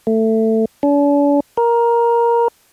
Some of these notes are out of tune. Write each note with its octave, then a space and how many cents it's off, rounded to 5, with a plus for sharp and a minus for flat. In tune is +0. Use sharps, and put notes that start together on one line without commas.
A3 +15
D4 -45
A#4 +10